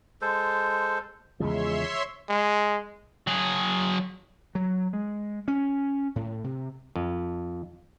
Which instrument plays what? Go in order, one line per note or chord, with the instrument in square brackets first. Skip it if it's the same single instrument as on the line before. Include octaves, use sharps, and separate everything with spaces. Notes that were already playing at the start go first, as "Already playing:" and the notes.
[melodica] G#3 A4 C5
[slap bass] E2 C#3 F3 [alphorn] G#3 [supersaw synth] C#5 E5 C6
[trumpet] G#3
[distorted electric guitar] F#3 G#4
[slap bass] F#3
G#3
C#4
A2
C3
[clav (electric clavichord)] F2